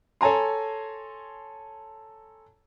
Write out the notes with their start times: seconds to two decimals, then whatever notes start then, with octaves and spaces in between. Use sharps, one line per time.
0.21 A4 C#5 G#5 A#5 C6